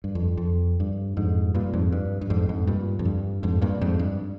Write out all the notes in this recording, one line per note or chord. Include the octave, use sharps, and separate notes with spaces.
G2
F2
F2
G2
F2 G#2
G2 A#2
F2 G#2
G2
G2
F2 G#2
F2 G#2
G2 A#2
F2
G2
F2 G#2
G2 A#2
F2 G#2
G2